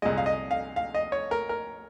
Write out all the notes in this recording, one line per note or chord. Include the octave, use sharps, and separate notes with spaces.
C2 A#2 G#3 D#5
F5
D#5
F5
F5
D#5
C#5
A#4
A#4